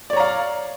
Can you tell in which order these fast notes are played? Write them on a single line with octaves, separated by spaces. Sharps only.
D5 C#5 A#5 F5